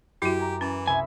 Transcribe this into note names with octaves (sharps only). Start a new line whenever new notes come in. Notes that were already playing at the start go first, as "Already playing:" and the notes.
F#2 E4 F#4 G4
G#5 A#5 D6
E3 C#4
C2 E5 G#5 B5